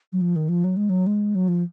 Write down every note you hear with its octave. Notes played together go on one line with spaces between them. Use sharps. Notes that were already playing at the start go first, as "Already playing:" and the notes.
F#3
F3
D#3
F3
F#3
G#3
F#3
G#3
F#3
F3